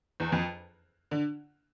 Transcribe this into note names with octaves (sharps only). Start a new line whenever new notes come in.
E2
F2
D3